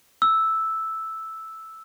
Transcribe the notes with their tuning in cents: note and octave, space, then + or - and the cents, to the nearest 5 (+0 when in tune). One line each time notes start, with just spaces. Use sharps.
E6 -5